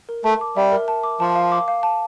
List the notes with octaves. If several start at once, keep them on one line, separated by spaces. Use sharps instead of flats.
A#4
A3 A5
D6
G3 E5
A#4
A5
D6
F3 A5
F5
D6
F5
A5